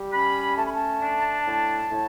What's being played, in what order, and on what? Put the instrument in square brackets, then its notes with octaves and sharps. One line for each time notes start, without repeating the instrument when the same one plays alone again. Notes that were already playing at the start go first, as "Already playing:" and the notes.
Already playing: [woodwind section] G3
C#4 B5
A3 A5
B5
A5
D4
A2
A2